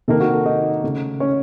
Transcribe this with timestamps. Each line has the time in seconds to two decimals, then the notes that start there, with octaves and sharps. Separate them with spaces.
0.08 C3 D#3 A#3 A4
0.20 F#4
0.33 A4
0.46 D#4 D#5
0.83 C#3 A3
1.20 C#4 C#5